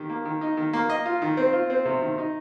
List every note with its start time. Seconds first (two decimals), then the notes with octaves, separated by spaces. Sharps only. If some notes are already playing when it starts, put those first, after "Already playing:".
Already playing: D#3 G4
0.10 A#3
0.25 D#3
0.41 D#4
0.57 D#3
0.73 A#3
0.90 D#5
1.06 F4
1.22 D#3
1.37 C4
1.53 F4
1.70 C4
1.85 C3
2.02 D#3
2.18 D#4